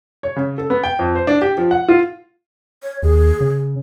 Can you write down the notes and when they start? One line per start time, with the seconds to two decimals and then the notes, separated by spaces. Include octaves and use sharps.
0.23 C#5
0.36 C#3
0.58 A4
0.70 B3
0.84 G5
0.99 F2
1.15 C5
1.27 D4
1.42 G4
1.58 F3
1.71 F#5
1.89 F4
2.83 C#5
3.03 D#2 G#4
3.41 C#3